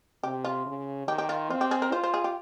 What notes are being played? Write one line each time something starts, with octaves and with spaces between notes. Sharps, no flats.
C3 G4
F4
C#3
D#3 G4
G4
F4
C4 F4
G4
G#4
A#4
F4 C5
C5
G#4
G4